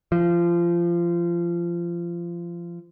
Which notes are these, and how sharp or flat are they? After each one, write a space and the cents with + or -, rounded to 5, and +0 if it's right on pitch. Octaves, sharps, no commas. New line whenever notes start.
F3 -25